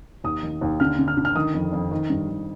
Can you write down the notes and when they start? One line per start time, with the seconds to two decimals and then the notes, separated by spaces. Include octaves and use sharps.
0.24 D#2 D#6
0.43 D#3
0.61 D#2
0.80 D3 F6
0.99 D3
1.08 F6
1.17 D3
1.25 F6
1.35 D#3 D#6
1.54 F2
1.73 F2
1.91 D#3
2.10 G2
2.29 D#3